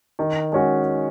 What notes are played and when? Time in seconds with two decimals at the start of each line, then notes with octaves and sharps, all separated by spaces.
0.19 D#3
0.52 G#3 C#4 F#4